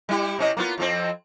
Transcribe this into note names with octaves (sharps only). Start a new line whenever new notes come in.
G3 E4 G4
C3 C#4 D#5
A#3 B3 F4
F2 F3 C4